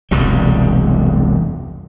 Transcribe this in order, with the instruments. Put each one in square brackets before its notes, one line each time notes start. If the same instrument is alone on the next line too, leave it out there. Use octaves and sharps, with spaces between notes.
[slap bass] E1 C2 F#2 G3